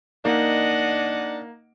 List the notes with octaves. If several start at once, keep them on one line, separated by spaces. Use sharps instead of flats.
A#3 D4 D#4 D#5 F#5